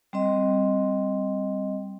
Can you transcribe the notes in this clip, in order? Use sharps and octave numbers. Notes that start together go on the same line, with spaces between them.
G3 C4 D#5